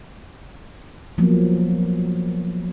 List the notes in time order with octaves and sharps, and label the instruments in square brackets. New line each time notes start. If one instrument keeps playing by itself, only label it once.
[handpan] F3 F#3 A#3 B3